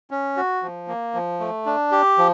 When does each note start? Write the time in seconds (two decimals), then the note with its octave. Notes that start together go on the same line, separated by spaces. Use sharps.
0.11 C#4
0.37 F#4
0.63 F3
0.88 A#3
1.14 F3
1.40 A3
1.66 D4
1.92 G4
2.18 F3